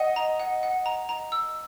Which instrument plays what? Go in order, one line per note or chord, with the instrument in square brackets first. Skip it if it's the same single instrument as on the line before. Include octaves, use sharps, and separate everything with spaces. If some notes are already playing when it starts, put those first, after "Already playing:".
Already playing: [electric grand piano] D#5 [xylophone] F#5
[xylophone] A#5
F#5
F#5
A#5
A#5
E6